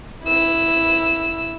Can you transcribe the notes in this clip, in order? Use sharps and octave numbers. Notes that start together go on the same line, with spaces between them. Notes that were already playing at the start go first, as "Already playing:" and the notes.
E4 E6